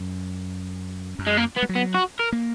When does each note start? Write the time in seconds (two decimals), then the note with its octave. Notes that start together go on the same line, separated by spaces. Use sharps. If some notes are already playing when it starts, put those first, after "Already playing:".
Already playing: F#2
1.19 F#2
1.27 G#3
1.37 A#3
1.56 B3
1.62 G#3
1.69 F#3
1.75 B3
1.94 F#4
2.20 A#4
2.32 A#3